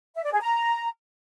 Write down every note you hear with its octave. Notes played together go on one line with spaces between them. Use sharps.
E5
D5
G#4
A#5